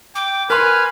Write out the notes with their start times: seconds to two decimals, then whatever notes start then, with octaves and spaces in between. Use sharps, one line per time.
0.15 G5 D6
0.50 A#4 B4 G#5 C6 F6